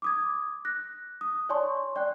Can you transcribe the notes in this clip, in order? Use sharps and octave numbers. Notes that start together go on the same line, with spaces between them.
D6 D#6 G#6
F#6 A#6
D#6
C#5 D5 G#5 A5 C6 C#6
D5 G5 F#6